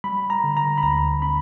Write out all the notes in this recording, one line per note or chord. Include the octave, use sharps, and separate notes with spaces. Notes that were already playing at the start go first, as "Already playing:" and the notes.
G3 B5
A#5
D3
A#5
B5
D2 A#5
C4 B5